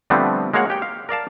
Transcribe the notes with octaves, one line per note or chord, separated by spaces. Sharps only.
D3 F3 G3 A3 B3 C4
G#3 A#3 F#4 C#5 F5 F#5
G4 G5
F5
A#4 D5 F5 A5